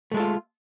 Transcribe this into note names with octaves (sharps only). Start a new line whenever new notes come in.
G#3 A3 F4 A4